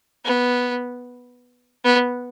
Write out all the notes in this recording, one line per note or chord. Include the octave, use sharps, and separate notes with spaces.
B3
B3